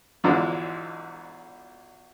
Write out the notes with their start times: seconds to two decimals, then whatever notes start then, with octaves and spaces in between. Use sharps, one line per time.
0.24 B1 E2 G#2 D3 F3 G#3